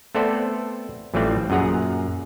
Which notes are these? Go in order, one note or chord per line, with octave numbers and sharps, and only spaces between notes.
A3 B3 C4 A4 C5 D5
A1 E3 F3 G3 A3 C4
F#2 A#2 G#4 F#5 A#5